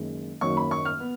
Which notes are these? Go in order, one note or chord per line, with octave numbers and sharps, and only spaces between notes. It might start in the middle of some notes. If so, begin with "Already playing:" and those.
Already playing: F#1 F#2 D#3 G#3
F#1 F#2 D#3 F#3 A#3 C#6
B5
C#6
F6
B3